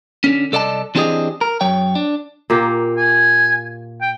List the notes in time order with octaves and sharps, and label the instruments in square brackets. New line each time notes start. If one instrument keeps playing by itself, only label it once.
[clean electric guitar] D3 C#4
C2 A4 D5 D#5 A5
E3 C4 D4 G4 G#4 D#5
A#4
F#2 F#3 C#5 G5
D4
[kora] A#2 A#3 G4
[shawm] G#5
G5